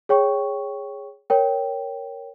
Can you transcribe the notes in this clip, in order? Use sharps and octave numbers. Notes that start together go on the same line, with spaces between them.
G#4 C#5 G5 C#6
A#4 C#5 G5